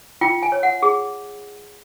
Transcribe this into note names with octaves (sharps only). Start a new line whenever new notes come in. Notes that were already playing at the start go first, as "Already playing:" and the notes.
F4 G5
G#5
C#5
F#5
G#4